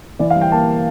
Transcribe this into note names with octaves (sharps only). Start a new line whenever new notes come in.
E3 D5
F5
G3
G5
A#3 A5